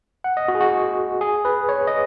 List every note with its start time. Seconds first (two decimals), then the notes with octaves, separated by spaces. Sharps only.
0.24 F#5
0.37 D#5
0.48 F#4
0.55 G#4
0.60 F#4
1.21 G#4
1.45 B4
1.69 C#5
1.87 D#5